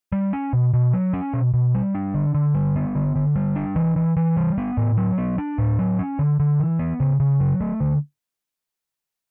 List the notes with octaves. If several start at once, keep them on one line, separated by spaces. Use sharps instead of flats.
G3
C#4
B2
B2
F#3
C#4
B2
B2
G3
D4
D3
D3
G3
B3
D3
D3
G3
D4
E3
E3
E3
G3
B3
A2
F#3
B3
D4
A2
F#3
C#4
D3
D3
E3
B3
C#3
C#3
F#3
A3
D3